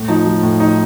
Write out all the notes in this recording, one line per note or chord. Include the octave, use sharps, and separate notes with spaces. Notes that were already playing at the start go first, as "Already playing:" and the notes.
Already playing: A2
F3 D#4
F3
A2
F3 D#4